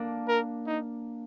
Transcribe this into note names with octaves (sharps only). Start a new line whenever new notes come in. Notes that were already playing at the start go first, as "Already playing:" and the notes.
Already playing: A#3 D4
A#4
D#4